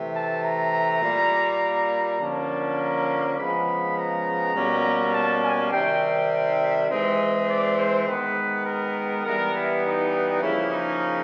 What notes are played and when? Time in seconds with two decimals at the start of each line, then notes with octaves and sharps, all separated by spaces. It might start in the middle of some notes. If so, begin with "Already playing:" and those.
Already playing: C3 E3 A3
0.13 A5
0.43 A#5
1.01 A#2 G3 A#3
2.19 D3 F3 A#3 C#4 A5
2.78 A#5
3.37 C#3 F3 G#3 B3 B5
3.96 A#5
4.54 B2 G3 A#3 C#4
5.13 A5
5.43 G#5
5.71 C3 D#3 G3 C4 G5
6.60 E5
6.89 E3 G#3 C4 D#5
7.48 D5
7.77 C5
8.07 D#3 G#3 B3 B4
8.66 A#4
9.24 E3 G3 B3 A#4
9.54 E4
9.83 D#4
10.42 C#3 F3 A#3 C#4 E4
10.71 D#4